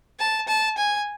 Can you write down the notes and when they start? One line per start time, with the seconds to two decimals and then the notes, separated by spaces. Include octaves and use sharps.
0.19 A5
0.48 A5
0.78 G#5